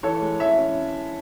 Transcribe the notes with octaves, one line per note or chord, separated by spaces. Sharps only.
E3 A4 C#5
G#3
E3 C#5 E5
C#4